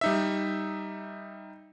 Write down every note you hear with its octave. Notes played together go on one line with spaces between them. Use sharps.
G3 D#4 E5